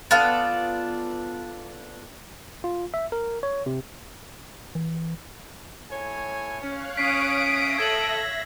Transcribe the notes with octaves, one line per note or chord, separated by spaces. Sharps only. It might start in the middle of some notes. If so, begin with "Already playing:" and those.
B3 D4 F4 A4
F4
E5
A#4
C#5
C3
E3
A2 C#5 G#5
C#4 C#5 F5 F#6
C#4 D#6 B6 C7 D7
E5 A#6
A4 G#6 B6 F#7